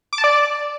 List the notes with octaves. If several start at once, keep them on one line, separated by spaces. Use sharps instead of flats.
D6
A5
D5